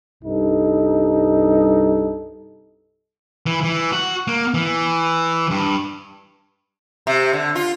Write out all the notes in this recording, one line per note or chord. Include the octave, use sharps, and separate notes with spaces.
C2 G2 D#4 A4
E3
E3
F#4
A#3
E3
G2
C3
D3
F4